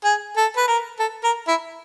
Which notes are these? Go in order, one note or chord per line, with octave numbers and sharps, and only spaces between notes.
G#4
A4
B4
A#4
A4
A#4
E4